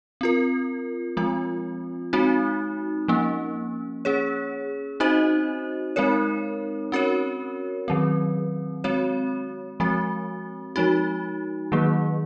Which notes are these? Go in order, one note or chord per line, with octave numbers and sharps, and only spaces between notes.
C4 F4 A#4
F3 G#3 C4 F4
G#3 C4 D#4 F#4
F3 A#3 C#4
C#4 G#4 C#5
C4 D#4 F#4 C5 D#5
G#3 C4 D#4 A#4 C#5
C#4 F#4 A#4 C#5
D#3 F#3 C4
G#3 C4 F#4 C#5
F3 G#3 C4 F#4
F3 G#3 D#4 F#4
D#3 F#3 A#3